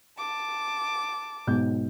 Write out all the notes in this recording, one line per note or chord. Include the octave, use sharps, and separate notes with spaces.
A5 D6
B1 G#2 G6